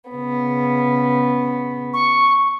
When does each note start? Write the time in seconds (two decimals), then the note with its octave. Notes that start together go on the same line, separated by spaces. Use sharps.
0.10 C#3 B3
1.93 C#6